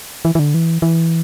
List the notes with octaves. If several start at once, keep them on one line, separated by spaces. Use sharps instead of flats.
E3
E3
D3
E3
E3